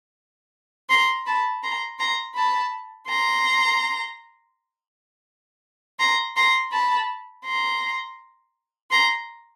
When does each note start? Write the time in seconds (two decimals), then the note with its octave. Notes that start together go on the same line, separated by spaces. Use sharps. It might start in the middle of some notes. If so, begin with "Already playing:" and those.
0.90 A#5 C6
1.26 A5 B5
1.63 A#5 C6
1.99 A#5 C6
2.36 A5 B5
3.08 A#5 C6
5.99 A#5 C6
6.37 A#5 C6
6.72 A5 B5
7.45 A#5 C6
8.91 A#5 C6